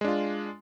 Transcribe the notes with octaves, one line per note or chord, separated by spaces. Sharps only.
G#3 D4 F4